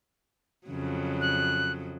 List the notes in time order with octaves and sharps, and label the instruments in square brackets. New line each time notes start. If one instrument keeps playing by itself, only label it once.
[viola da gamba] F2 C#3 F#3
[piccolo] F#6